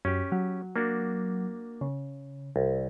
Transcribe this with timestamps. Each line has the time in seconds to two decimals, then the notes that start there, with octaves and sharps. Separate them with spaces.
0.05 F#2 C#4 G4
0.32 F#3
0.76 A#3 D4 F#4
1.81 C#3
2.56 C2